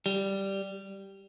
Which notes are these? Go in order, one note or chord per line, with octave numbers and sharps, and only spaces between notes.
G3